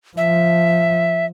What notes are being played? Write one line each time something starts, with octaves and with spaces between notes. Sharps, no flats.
F3 E5